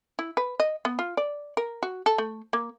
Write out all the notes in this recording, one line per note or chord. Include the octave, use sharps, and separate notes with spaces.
E4
B4
D#5
B3
F4
D5
A#4
F#4
A4
A3
A#3